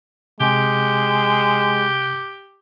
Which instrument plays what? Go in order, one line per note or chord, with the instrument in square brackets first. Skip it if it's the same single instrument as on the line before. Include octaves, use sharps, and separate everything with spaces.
[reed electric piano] C3 [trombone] G#3 [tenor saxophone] G4